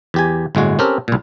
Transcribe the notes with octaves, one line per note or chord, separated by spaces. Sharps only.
E2 G4 G#5
G1 A2 G#3 F#4
C4 C#4 G4 A4 A#4
C2 A#2